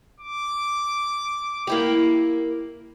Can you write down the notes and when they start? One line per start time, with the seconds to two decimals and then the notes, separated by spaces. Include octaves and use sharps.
0.20 D6
1.67 A#3 E4 G4